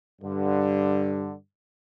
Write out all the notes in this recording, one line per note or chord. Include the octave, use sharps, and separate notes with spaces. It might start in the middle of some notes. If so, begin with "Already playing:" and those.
G2 D3